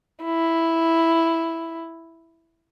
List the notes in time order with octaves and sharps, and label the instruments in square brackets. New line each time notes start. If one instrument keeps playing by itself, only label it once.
[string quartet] E4